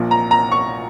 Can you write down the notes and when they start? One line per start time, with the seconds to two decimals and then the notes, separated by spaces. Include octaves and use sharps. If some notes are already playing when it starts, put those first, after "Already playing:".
Already playing: A#1 A#2
0.11 A#5
0.31 A#5
0.52 C#6